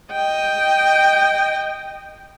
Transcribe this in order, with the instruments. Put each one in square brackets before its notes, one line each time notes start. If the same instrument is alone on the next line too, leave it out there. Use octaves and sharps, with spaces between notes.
[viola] D#5 G5